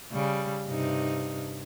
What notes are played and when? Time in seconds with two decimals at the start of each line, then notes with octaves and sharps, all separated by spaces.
0.12 C#3 G3
0.68 G2 C3 D#4